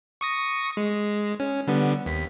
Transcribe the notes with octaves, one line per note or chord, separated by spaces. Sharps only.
C#6 D#6 A#6
G#3
C#4
D3 G3 B3
D#2 B6